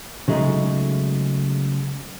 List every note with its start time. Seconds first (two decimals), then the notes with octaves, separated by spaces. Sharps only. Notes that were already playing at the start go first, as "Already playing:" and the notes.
0.28 C#3 F#3 G#3 A3 D#4